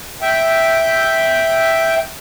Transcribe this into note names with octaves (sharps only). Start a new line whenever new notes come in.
E5 G5